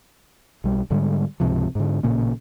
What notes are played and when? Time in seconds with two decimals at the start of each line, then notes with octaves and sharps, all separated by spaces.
0.64 B1 G3
0.90 G#2 D3 G3 G#3
1.40 C#2 G#2 C3 F3
1.75 G#2 D3
2.03 A1 A#2 C#3 A#3